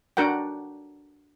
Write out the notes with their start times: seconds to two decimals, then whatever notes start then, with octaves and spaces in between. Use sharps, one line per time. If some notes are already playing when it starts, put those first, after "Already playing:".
0.17 D4 F#4 A#4 F#5 G5